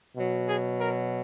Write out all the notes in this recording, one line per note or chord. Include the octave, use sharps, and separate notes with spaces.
B2 F#3
G#4
A#4